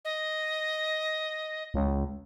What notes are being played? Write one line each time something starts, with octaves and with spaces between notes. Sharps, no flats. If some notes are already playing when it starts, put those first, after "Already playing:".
D#5
C#2